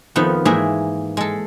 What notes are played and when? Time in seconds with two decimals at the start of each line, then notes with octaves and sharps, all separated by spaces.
0.16 F2 D#3 F3 B3
0.45 G#2 E3 A#3 G#4 E5 G5
1.17 G#3 A4